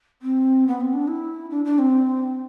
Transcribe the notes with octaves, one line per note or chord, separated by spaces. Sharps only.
C4
B3
C4
D4
E4
D4
D4
C4